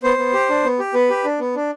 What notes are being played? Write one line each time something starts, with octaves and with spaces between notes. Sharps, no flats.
B3 C5
B3
G4
D4
B3
G4
B3 B4
G4
D4
B3
D4